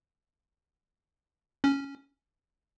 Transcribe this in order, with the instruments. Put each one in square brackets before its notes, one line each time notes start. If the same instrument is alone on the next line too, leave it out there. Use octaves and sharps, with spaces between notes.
[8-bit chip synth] C#4